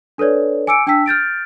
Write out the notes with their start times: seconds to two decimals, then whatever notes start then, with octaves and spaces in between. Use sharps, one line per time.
0.18 D4 A4 B4 C#5 D5
0.67 G#5 D6 E6 C#7 D7
0.87 D4 G5 A5 E6 B6
1.06 F6 G6 A6 D7